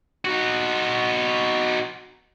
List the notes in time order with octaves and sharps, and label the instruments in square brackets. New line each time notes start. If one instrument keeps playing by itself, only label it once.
[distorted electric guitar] D#4 F#4